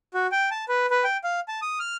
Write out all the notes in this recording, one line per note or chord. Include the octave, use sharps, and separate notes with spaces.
F#4
G5
A5
B4
B4
G5
F5
A5
D#6
F6